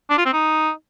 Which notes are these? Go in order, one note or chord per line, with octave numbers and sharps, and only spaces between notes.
D4
F4
C4
D#4